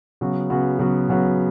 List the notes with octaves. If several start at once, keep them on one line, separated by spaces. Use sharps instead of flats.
C#3 F#3 B3 F#4
C#3 F#3 B3 F#4
C#3 F#3 B3 F#4
C#3 F#3 B3 F#4